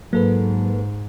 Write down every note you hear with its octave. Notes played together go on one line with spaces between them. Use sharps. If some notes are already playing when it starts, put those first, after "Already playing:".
G#2 F#3 A#3 A4 B4